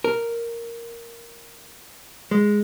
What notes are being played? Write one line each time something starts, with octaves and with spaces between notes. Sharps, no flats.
A#4
G#3